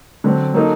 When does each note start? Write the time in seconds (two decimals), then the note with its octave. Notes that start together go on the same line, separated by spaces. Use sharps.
0.24 D3 F#3 C4
0.54 F#3 A#3 D#4 A4